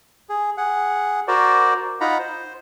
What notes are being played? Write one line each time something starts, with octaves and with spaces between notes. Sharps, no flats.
G#4
G#4 F#5
F#4 A#4 C5 D5
D#4 F4 F#5 A#5 B5
C5